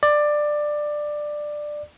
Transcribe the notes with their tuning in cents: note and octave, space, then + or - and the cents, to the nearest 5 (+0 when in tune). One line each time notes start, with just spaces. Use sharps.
D5 +15